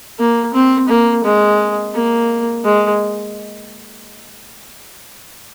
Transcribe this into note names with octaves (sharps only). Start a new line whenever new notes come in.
A#3
C4
A#3
G#3
A#3
G#3